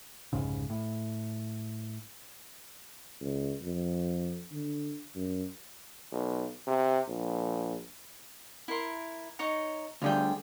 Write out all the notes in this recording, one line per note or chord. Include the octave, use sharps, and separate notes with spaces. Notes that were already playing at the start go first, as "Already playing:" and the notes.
F1 C2 G#2 C#3
A2
C#2
F2
D3
F#2
B1
C3
A#1
E4 A#4 C6
D#4 C#5 A#5
D2 D3 G3 F4 G#4 G5